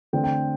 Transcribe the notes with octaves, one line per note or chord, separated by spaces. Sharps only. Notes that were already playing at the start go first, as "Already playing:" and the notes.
D3 A3 C4 G5
G5